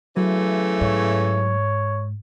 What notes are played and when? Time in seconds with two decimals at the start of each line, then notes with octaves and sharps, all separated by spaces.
0.17 C#3 E3 F#3 A3
0.81 G#2 C#5